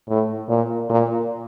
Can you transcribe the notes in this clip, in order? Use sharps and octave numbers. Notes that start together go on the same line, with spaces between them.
A2
A#2
A#2